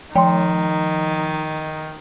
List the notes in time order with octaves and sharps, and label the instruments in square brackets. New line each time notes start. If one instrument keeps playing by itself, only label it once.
[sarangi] D#3 [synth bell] F3 [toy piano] G5 C6